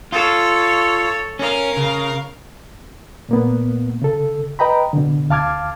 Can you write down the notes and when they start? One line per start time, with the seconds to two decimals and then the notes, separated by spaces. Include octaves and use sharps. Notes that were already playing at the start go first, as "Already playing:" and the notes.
0.12 F4 A4 C#5
1.39 C#4 A#4 F5
1.77 C#3
3.29 A#2 A#3 B3
4.02 C#3 A4
4.59 B4 D#5 G5 A#5 B5
4.93 B2 D3
5.30 D2 F5 A5 D6 F6 G#6